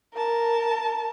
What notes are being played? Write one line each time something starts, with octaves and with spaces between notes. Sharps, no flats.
A#4 A5